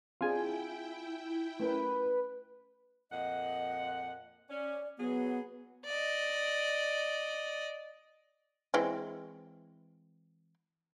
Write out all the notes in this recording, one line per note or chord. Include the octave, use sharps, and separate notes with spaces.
C4 D4 E4 F4 G#4 G5 G#5
A3 C#4 A#4 B4
F2 A#2 D#5 F#5
C#4 D5
F#3 B3 G#4
D5 D#5
E3 G#3 C4